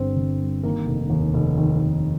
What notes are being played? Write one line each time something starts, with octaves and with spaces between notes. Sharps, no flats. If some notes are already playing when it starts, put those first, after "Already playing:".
Already playing: G1 G2 G3 C4 C5
D3
G3
D#3 A#3 A#4
F1
D#2
F1
D#3
F1